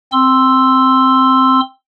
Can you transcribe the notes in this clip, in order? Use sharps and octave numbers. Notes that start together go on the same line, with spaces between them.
C4 C6 E6